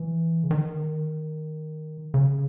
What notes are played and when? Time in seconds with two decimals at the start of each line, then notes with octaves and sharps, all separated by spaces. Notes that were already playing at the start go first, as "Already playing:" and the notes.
Already playing: E3
0.43 C#3
0.51 D#3
2.14 C#3